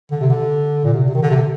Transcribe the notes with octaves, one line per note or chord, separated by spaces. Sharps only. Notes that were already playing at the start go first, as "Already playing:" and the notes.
D3
C3
D3
A#2
C3
C3
D#3
D3
C3
D3